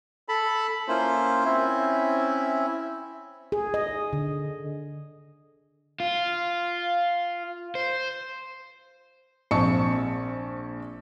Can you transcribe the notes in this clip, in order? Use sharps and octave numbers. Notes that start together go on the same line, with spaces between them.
A4 A5 B5
A#3 C#4 E4 F4 C5
C4 C#4 E4 E5
G#4
D#5
D3
F4
C5
A#1 C4 A5 C#6 C#7